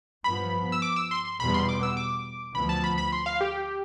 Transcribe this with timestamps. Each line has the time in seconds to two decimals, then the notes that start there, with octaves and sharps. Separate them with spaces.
0.24 G2 F3 B3 B5
0.72 E6
0.82 D6
0.96 E6
1.11 C6
1.25 C6
1.40 E2 B2 G3 B3 B5
1.54 C6
1.69 D6
1.83 E6
1.97 D6
2.55 D2 D3 F3 B3 B5
2.69 A5
2.84 B5
2.98 B5
3.12 C6
3.26 F5
3.41 G4